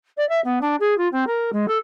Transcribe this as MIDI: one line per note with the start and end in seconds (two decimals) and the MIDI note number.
0.17 0.27 74
0.28 0.40 76
0.44 0.58 59
0.61 0.75 62
0.80 0.96 68
0.97 1.08 65
1.12 1.26 60
1.26 1.50 70
1.52 1.66 56
1.68 1.77 69